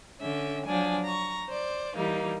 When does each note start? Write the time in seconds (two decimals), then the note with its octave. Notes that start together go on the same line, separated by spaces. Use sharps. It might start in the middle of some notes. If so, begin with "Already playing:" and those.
0.21 D3 C#4 E5
0.65 F3 F#3 D4 G#5
1.04 A#5 C#6
1.49 C5 D5
1.95 E3 G3 A#3 D#4